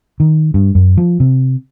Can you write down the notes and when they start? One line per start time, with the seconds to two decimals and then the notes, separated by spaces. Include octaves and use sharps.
0.20 D#3
0.54 G2
0.75 F#2
0.97 F3
1.20 C3